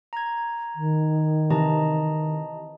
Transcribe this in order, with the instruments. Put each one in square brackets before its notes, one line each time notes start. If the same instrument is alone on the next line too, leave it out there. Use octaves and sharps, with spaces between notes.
[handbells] A#5 G#6
[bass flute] D#3
[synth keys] C3 E3 [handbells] D#5 A5 A#5